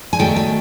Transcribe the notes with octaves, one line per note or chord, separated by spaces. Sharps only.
G#5
D#3 F#3 A3 G5
G#5